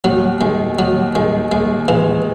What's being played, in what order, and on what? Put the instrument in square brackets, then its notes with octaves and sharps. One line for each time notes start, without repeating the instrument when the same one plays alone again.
[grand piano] D#2 [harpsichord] F#3
[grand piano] D#3 [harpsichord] G#3
[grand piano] D#2 [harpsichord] F#3
[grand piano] D#3 [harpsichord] G#3
[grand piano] D#2 [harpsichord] G#3
[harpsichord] E3 [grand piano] G#3